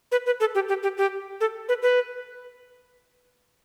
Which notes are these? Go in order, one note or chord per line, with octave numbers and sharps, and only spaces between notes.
B4
B4
A4
G4
G4
G4
G4
A4
B4
B4